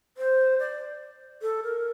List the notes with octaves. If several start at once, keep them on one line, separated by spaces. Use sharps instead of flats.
C5
D5
A4
A#4